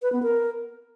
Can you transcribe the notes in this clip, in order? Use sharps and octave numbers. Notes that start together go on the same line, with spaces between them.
B4
B3
A#4